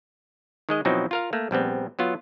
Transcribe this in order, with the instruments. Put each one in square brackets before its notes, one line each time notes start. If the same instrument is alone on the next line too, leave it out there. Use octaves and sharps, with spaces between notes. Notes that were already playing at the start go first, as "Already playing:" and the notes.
[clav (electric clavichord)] D#3 G#3 D#5
B2 F3 F#3 C4 D#4 E4
F4 A#4 F5
A3 A#3
A#1 G3 B3 C4
F#3 B3 F4